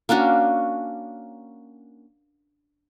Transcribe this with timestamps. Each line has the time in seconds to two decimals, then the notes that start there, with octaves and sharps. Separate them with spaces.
0.09 A#3 C#4 D4 F#4